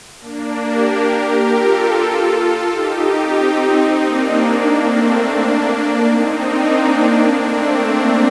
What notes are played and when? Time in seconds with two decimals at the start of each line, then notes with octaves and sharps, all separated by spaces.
0.20 A#3 D4
0.62 G4 A#4
1.04 G4 A#4
1.46 F4 A4
2.72 D#4 G4
3.14 C4 D#4
3.98 A#3 D4
4.82 A3 C4
5.24 A#3 D4
6.08 C4 D#4
6.50 A#3 D4
7.34 A3 C4